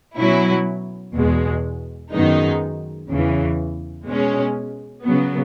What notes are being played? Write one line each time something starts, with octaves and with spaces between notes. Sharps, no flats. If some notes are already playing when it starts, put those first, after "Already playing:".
B2 F#3 C#4 E4
E2 B2 G#3
F#2 D#3 G#3 B3 D#4
E2 C#3 E3
B2 G#3 C#4
C#3 F#3 B3